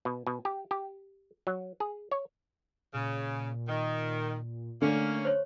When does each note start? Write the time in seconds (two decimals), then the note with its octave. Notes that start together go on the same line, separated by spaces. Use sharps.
0.05 B2
0.27 B2
0.45 G4
0.71 G4
1.47 F#3
1.80 G#4
2.11 C#5
2.94 A#2 C#3
3.68 D#3
4.82 D3 A3 A#3 C#4
5.25 C5 C#5